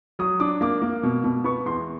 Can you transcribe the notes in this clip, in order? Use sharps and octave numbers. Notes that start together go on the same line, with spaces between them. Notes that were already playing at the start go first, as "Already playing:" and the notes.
F#3 D#6
D4 D6
A#3 D6
A#3
B2
B2
B3 C#6
E2 C6